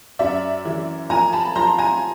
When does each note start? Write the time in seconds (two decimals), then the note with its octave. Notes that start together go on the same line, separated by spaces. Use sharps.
0.19 F#2 D5 E5
0.65 E3
1.10 F3 G#5 A#5
1.33 A5 B5
1.56 F3 A#5 C6
1.78 G#5 A#5